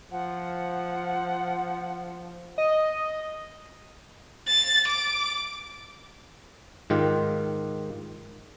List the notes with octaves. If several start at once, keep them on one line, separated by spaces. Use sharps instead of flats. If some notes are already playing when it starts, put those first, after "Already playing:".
F3 F#5
D#5
A6
D6
G#2 D#3 F4 G4